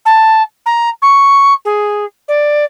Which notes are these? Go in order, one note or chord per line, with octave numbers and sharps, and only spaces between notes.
A5
A#5
C#6
G#4
D5